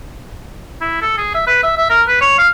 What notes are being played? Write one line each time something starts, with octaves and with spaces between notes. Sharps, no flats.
E4
A4
G#4
E5
B4
E5
E5
A#4
B4
C#5
F5